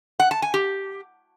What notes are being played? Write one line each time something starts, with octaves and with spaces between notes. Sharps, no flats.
F#5
A5
G#5
G4